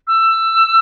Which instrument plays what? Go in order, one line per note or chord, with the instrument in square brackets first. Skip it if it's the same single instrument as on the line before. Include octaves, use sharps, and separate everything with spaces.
[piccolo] E6